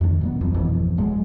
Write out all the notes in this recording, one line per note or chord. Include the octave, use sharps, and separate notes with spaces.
F2 D#3 C#4 D4
A#2 F#3 B3
D1 F2 F3 C4
G#1 F2 B2 E3
D1 F#3 G#3